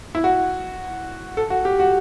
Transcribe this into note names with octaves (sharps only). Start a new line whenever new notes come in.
E4
F#4
A4
F#4
G4
F#4